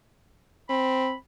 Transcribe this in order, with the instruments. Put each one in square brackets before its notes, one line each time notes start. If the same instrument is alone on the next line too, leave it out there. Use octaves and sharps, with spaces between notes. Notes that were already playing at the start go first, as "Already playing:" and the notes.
[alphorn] C4 [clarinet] B5